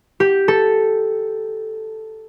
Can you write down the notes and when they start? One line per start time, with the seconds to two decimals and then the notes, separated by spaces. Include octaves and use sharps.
0.20 G4
0.48 A4